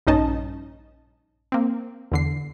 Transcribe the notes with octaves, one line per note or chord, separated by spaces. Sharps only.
A#1 G2 C#4 D#4 D#5 A5
A#3 C4
E2 D3 C7